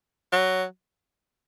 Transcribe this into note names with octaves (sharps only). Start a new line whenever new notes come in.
F#3